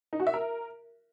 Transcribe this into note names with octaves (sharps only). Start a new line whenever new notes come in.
D#4
F#4
E5
A#4